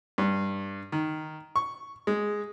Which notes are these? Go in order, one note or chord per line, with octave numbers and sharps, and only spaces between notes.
G2
D#3
C#6
G#3